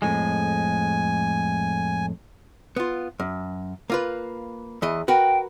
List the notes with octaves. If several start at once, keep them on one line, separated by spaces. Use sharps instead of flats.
F2 A2 G#3 G#5
B3 F4
F#2
A#3 F4 B4
E2 E3 D#5
F#4 A#4 B4 G5